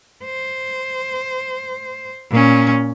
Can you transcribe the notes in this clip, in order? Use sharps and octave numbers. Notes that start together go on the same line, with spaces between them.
C5
A#2 C#4